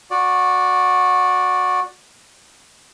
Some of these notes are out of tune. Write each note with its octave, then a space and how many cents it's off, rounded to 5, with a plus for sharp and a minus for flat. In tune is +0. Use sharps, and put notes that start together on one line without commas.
F#4 -15 D5 +0